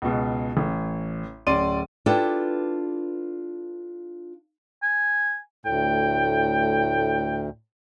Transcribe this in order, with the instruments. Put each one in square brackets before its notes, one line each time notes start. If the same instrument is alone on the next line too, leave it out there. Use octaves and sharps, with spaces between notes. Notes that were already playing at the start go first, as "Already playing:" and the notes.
[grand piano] C#2 B2
A1
D1 C#4 D5 C6 D#7
[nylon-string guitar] D4 E4 F4 G4 A4 B4
[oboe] G#5
[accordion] D2 [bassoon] A2 [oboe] G5